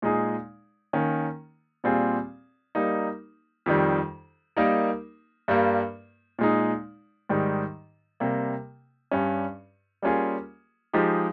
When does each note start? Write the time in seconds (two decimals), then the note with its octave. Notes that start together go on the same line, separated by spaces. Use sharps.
0.02 A#2 G#3 D#4 G#4
0.93 D#3 A#3 C#4
1.84 A#2 G3 C4 F4 G#4
2.75 G3 A#3 D#4
3.66 F2 D#3 G3
4.57 G3 A#3 D#4 A#4
5.48 G2 G3 A#3
6.39 A#2 G#3 D#4
7.29 G#2 D#3 G3
8.20 C3 G3 A#3
9.11 G2 G3 C#4
10.02 G3 A#3 C#4 F4 G#4
10.93 F3 G#3 D#4 G4